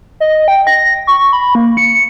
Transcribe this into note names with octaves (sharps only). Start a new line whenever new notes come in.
D#5
G5
A#6
C#6
B5
A#3
C#7